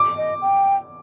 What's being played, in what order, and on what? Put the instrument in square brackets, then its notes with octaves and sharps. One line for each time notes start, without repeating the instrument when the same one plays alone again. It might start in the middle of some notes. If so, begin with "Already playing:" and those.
Already playing: [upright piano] D6
[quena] D#5
G5